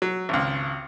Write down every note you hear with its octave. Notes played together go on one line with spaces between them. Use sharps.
F#3
G#1 C#2